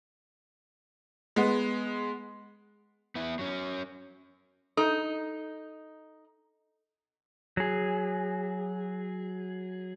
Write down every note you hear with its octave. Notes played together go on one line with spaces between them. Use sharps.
G#3 B3
B3 E4
F#3 C#4
D#4 A4
F#3 G#4